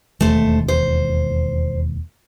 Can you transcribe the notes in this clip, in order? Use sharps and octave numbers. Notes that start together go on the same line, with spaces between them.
E1 D#2 A3 C5
C5